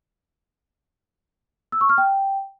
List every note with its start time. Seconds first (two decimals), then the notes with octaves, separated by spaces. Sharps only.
1.72 E6
1.81 C#6
1.89 F6
1.98 G5